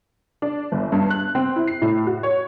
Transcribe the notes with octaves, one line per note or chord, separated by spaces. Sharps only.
D4
G1
G2
F#6
C4
E4
C7
A2
F#4
C#5